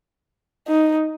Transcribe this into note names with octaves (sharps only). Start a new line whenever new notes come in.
D#4